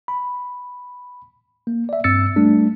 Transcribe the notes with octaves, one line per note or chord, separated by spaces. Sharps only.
B5
A#3
D5 E5
G2 C4 E6 A6 C#7
G3 A3 D4